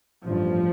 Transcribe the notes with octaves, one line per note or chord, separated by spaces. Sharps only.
A1 G2 F3